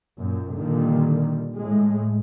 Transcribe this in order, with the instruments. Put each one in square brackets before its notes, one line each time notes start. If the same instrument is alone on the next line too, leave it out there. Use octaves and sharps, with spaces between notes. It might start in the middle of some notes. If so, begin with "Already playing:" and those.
[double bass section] F#2 A#2
A#2 D3 D#3 G3
A2 G#3